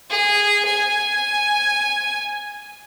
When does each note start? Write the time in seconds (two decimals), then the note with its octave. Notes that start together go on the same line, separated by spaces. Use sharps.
0.10 G#4
0.65 G#5